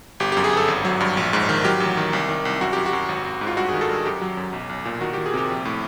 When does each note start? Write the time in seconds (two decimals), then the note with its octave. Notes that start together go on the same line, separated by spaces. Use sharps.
0.20 G1 G4
0.32 F#2 G4
0.44 G#4
0.53 G1 A4
0.68 G#1
0.85 F#3
1.01 G2
1.17 A#1
1.33 G#2
1.49 D#3
1.65 F#3 G4
1.80 A1
1.97 D#3
2.13 C2
2.29 D#3
2.45 C2
2.61 F#2 F#4
2.73 F#2 G4
2.86 F#4
2.93 F#2
3.09 G#1
3.24 G#1
3.41 G#2
3.47 F4
3.57 G2 F#4
3.68 D#3 G#4
3.81 A4
3.89 G2 G#4
4.06 F#2 G4
4.21 F#3
4.37 F#2
4.53 B1
4.69 B1
4.85 A#2
5.01 D#3 F#4
5.13 D#3 G4
5.26 G#4
5.34 C3 G4
5.50 A#1
5.65 A2